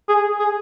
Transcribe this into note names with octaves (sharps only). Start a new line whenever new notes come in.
G#4
G#4